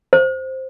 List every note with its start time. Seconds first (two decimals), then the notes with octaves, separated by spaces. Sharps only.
0.13 C5